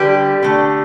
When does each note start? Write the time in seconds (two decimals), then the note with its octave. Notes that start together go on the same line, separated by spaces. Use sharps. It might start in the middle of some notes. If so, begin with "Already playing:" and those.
Already playing: D3 G3 G4 B4
0.43 D3 A3